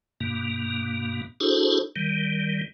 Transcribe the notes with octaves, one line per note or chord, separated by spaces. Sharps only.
G2 B2 A#3
D4 E4 F#4 G#4 A4 C5
D#3 G3